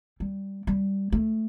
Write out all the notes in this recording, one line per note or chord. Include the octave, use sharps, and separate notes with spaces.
G3
G3
A3